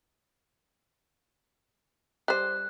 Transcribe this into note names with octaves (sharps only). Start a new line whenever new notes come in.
G3 C5 F#6